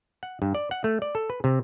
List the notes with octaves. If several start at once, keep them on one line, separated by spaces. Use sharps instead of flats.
F#5
G2
D5
F#5
A3
D5
A4
B4
C3